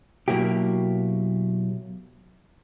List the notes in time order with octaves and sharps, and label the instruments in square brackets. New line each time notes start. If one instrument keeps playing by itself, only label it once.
[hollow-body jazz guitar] B2 F#3 A#3 E4 G4